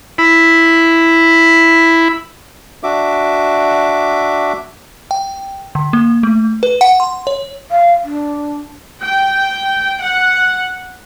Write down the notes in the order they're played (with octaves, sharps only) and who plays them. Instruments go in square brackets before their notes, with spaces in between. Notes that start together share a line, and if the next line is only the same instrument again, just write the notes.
[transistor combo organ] E4 B5
[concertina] D4 F#4 E5 D6
[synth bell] G5
D3
A#3
A3
B4
F#5
C6
C#5
[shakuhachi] F5
D4
[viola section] G5
F#5